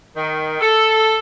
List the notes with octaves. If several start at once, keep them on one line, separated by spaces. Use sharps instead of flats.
D#3
A4